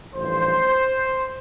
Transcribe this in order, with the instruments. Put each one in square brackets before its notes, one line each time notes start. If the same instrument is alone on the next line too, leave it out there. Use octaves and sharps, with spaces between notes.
[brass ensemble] A1 G2 F3 C5